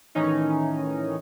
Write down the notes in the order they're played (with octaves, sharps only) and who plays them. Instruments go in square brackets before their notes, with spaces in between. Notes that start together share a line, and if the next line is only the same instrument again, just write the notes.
[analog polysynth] A2 D#3 E3 C#4 D#4